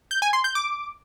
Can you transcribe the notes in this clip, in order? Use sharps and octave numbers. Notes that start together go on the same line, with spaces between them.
G6
G#5
C6
G6
D6